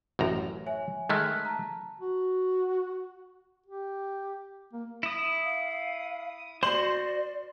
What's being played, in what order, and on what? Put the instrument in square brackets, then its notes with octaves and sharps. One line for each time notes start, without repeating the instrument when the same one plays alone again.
[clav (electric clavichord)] A1 F#2 A#5
[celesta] C#5 E5 G#5
[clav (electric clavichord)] D#3 G#3 A3 [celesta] F6 F#6 B6
[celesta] A5 A#5
[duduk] F#4
G4
A#3
[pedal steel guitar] E4 D#6
[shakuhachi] F5
[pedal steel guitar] F#4 C5 [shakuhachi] D5 [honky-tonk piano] C6 F#7